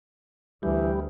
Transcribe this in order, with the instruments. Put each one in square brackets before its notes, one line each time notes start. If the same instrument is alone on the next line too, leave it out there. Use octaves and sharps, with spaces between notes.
[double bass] D2 [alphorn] E3 [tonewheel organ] G3